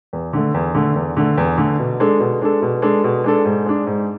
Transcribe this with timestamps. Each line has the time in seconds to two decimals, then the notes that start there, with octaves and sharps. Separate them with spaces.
0.13 E2
0.33 D3 A3
0.54 E2
0.75 D3 A3
0.96 E2
1.17 D3 A3
1.38 E2
1.58 D3 A3
1.79 B2
2.00 G#3 D4 A4
2.20 B2
2.42 G#3 D4 A4
2.62 B2
2.82 G#3 D4 A4
3.04 B2
3.24 G#3 D4 A4
3.45 G#2
3.66 G#3 D4
3.87 G#2